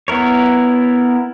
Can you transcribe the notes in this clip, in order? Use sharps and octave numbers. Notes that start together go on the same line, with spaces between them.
B3 E4 A#4 C#5